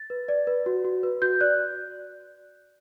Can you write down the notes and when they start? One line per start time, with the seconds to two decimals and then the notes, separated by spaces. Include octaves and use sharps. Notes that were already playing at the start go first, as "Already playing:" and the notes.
Already playing: A6
0.10 B4
0.28 D5
0.47 B4
0.66 F#4
0.85 F#4
1.03 B4
1.22 F#4 G6
1.41 D5 F#6